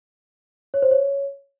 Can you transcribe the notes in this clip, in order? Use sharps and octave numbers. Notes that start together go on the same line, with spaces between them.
C#5
C5
C#5